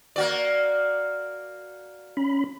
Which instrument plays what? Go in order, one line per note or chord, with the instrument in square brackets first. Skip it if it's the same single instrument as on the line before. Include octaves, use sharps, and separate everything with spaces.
[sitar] A#3 F#4 D5
[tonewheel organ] C#4 B5